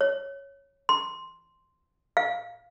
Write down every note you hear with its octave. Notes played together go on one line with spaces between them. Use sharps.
C#5
C6
F5